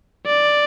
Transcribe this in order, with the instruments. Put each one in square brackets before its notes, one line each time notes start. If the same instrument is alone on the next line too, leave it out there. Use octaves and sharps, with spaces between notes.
[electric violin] D5